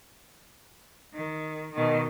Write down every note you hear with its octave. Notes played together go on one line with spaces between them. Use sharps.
D#3
B2 D#3